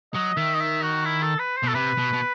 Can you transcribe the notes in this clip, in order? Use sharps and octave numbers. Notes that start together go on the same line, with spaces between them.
F#3 D#5
D#3 E5
D#5
E5
F#4
E4
A4
B4
C5
B2 A4
C3 B4
B2
B2